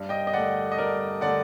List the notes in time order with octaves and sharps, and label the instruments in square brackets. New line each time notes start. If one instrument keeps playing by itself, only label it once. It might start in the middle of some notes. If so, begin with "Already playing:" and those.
Already playing: [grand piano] G2
D#5 G5
D#5
D3 A3 D5 F#5
D#5
G2 A#4 D5
D3 A3 D5 F#5